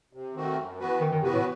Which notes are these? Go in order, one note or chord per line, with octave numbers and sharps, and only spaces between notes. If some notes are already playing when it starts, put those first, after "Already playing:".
C3
D#3 A3 C4 F#4
F#2
E3 B3 F#4 B4
F#2 D#3
D#3
C3 E3 B3 F#4 B4
A2